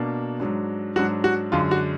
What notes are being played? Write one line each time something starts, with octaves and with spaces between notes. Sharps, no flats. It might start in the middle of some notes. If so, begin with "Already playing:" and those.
Already playing: B2 A#3 D4
G#2 F#3 D4
G#2 F#3 D4 F#4
F#4
F#2 D3 G#3 D4 F4
F#4